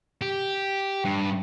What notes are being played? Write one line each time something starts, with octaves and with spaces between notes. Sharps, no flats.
G4
G2